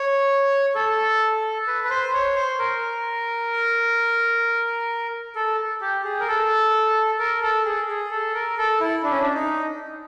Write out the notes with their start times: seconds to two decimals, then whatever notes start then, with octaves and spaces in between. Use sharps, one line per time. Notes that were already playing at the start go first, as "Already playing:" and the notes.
Already playing: C#5
0.75 A4
1.67 B4
1.84 B4
1.90 C5
2.13 C#5
2.36 C5
2.59 A#4
5.35 A4
5.81 G4
6.04 G#4
6.20 A#4
6.28 A4
7.19 A#4
7.42 A4
7.65 G#4
7.88 G#4
8.11 A4
8.34 A#4
8.58 A4
8.80 E4
9.03 D4
9.11 C#4
9.20 D4
9.34 D#4